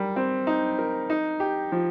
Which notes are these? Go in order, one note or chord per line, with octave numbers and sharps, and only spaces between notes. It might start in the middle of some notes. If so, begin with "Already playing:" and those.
Already playing: G3 A#4
C4
D#4
A#4
D#4
G4
F3